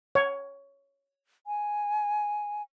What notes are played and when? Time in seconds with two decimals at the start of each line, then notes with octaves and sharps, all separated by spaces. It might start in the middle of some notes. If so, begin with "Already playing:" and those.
0.15 C#5
1.47 G#5